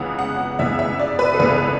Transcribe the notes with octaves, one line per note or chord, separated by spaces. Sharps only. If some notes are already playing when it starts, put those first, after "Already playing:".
Already playing: C#2 C#3 E3 B3 F#5
F#5
C#2 C#3 E3 B3 E5
E5
D5
B4
A4
C#2 C#3 E3 B3 B4